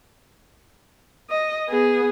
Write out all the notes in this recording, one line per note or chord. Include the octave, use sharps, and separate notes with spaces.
D#5
B3 G#4